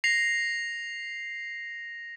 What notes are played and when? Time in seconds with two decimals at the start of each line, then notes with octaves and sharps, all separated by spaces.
0.04 A#6 C7 F7